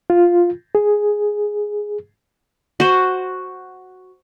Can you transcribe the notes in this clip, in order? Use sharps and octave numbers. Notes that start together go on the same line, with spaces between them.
F4
G#4
F#4 C5